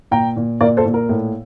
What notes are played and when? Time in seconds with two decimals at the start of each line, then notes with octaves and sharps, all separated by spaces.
0.11 A#2 G5 A#5
0.36 A#2
0.61 A#2 A#4 D5
0.77 A4 C5
0.85 A#2
0.94 A#4
1.09 A2